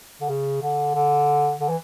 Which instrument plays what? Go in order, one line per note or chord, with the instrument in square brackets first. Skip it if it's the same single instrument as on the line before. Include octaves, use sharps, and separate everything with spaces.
[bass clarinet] D3
C#3
D3
D3
D3
E3